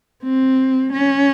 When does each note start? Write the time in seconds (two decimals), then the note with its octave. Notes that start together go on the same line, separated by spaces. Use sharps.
0.23 C4
0.93 C#4